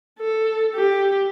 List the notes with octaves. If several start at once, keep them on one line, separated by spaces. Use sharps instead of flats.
A4
G4